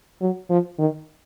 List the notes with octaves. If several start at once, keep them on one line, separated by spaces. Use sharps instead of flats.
F#3
F3
D#3